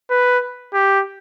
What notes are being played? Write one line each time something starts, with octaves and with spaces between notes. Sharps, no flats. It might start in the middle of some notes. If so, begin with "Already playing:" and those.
B4
G4